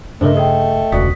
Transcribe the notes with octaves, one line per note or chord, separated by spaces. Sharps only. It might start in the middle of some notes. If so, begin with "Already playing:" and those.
G2 C#3 E3 A3 D4 A#4 C5 D#5
G#4 D#5 G5
E1 C#2 B2 F#4 D5 D#6 B6